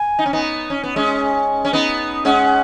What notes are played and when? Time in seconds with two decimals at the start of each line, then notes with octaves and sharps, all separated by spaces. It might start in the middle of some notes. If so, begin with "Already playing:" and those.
Already playing: G#5
0.19 D#4
0.26 C#4
0.33 B3 D#4
0.70 C#4
0.83 B3
0.96 G#3 C#4
1.65 C#4
1.73 B3 D#4
2.25 G#3 C#4 F#5